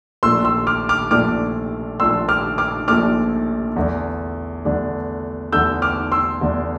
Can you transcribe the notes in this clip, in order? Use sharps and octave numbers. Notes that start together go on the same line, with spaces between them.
A#1 A#2 A3 D4 C6 E6
C6 E6
D6 F6
D6 F6
A#1 A#2 A3 D4 D6 F6
A#1 A#2 A3 D4 C6 E6
D6 F6
D6 F6
A#1 A#2 A3 D4 D6 F6
E2 D3 A3 D4
E2 D3 A3 D4
E2 D3 A3 D4 E6 G6
D6 F6
C6 E6
E2 D3 A3 D4